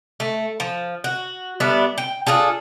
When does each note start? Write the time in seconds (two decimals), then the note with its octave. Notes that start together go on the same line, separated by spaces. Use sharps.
0.20 A3
0.60 F3
1.04 F#4
1.60 G3 B3 D4 E5
1.98 G5
2.27 D4 F4 G#4 A4